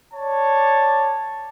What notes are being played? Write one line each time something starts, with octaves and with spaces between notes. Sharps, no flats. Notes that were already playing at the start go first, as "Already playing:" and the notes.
C#5 D5 A5